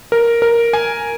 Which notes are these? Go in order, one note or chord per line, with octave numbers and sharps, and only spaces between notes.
A#4
A#4
G#5